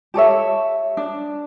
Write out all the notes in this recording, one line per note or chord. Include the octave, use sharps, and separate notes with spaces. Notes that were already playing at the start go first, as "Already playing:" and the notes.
G4 A4 C#5 E5
D4